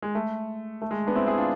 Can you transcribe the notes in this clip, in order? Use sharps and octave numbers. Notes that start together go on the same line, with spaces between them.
G#3
A3
A3
G#3
B3 D4
C4 E4
E4 G#4
D4 F4